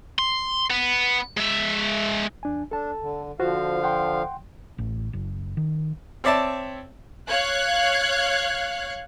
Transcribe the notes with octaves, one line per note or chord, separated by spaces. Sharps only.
C6
B3
G#3 E5
E2 D4 G#5
D4 A4 A5
D3
D3 F3 F4 F#4 C5 F5
F#5 G5 C6
A1
F#1
D#3
C4 C#5 D5 E5 A5
C#5 F5 F#6 G#6